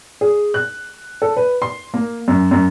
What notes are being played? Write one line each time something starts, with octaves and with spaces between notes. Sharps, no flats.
G#4
F#6
A4
B4
C6
A#3
F#2
F#2